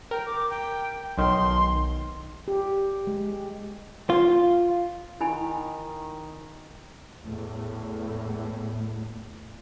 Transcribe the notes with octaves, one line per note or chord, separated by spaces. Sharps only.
A#4 G5
D6
G5
B1 D#3 C6
G4
G#3
F4
D#3 E4 G#5 B5
E2 A2 A3